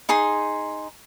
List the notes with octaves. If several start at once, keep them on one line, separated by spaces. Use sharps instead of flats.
D#4 G#4 C6